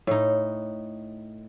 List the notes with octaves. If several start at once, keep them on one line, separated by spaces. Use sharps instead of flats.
A2 D#4